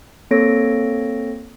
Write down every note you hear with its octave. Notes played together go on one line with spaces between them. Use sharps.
A#3 C4 A4 C#5 A#6 D7